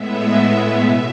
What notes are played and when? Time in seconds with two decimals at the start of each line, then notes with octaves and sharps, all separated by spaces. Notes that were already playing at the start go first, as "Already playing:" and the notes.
Already playing: A2 G#3 B3 E5
0.82 B2 E5